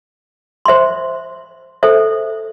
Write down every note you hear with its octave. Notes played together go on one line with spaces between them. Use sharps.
C5 E5 C6
A4 C5 E5